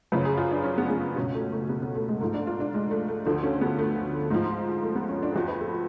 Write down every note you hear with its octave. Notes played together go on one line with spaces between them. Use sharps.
F#2 C#3 F3 B4
G#4
F4
D4
C#4
B3
B3
C#2 B2 C#4
A3
A3
B3
B3
A3
G#3
G#2 F3 A3
D4
F4
D4
G#3
A3
A3
D2 D3 F3 A3
C#4
B3
A3
G#2 F3 G#3
A3
B3
C#4
D4
G#4
F2 F3 F#4
B4
A4